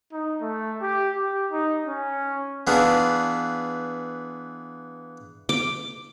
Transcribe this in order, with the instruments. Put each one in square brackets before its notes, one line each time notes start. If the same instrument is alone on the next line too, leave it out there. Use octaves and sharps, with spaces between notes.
[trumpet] D#4
A3
G4
G4
D#4
C#4
[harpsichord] E3 B3 D4 F4 G#4
[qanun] D6